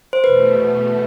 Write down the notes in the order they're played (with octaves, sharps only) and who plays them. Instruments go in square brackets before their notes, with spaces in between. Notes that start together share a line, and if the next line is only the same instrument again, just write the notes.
[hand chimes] C5
[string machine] E2 B2 A3 [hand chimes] B4